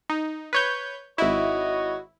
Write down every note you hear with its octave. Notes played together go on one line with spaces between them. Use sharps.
D#4
B4 C#5 G6
G#1 E4 F#4 C#5 D#5